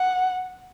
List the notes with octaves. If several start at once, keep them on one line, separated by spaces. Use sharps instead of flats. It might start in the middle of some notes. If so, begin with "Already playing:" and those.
Already playing: F#5